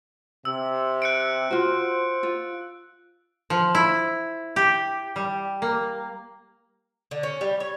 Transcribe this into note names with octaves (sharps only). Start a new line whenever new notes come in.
C3 E6
F#6 C#7 D7
F4 F#4 C5
F4
F3
E4
G4
G3
A#3
D3
C#4
G3
C#5